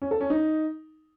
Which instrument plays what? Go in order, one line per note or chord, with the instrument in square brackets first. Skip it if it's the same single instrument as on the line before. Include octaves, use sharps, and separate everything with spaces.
[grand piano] C#4
A4
C#4
D#4